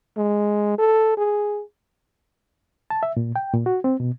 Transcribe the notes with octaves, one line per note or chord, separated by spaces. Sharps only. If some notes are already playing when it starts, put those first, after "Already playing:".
G#3
A4
G#4
A5
E5
A#2
G5
A#2
F#4
C4
B2